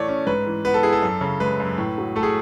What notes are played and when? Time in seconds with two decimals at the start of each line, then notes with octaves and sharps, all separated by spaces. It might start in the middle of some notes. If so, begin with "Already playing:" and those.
Already playing: A2 E3 A3 C#5 D5
0.09 C#4
0.27 G#2 B4
0.46 E3
0.65 B3 B4
0.74 A4
0.83 E4 G#4
0.93 A4
1.02 F#2
1.21 C#3
1.40 G#3 B4
1.60 F#2
1.78 A2
1.98 F#3
2.16 A3 A4
2.23 G#4